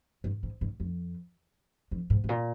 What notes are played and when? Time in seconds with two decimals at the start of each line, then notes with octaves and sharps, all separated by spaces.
0.24 G2
0.43 G#2
0.61 G2
0.80 F2
1.91 F2
2.10 G#2
2.24 G#2
2.29 A#2